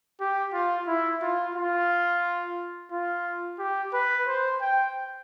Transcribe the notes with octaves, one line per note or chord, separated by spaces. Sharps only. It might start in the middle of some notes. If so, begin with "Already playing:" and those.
G4
F4
E4
F4
F4
F4
G4
B4
C5
G5